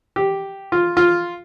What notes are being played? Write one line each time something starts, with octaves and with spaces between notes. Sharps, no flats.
G4
F4
F4